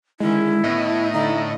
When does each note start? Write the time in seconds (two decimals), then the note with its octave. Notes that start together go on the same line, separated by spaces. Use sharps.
0.20 D3 D#3 G#3 C#4 E4
0.64 A2 B3 D#5
1.13 D3 A3 D#4 E4